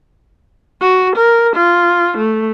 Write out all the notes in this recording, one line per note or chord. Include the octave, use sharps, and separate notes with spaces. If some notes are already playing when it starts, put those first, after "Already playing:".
F#4
A#4
F4
A3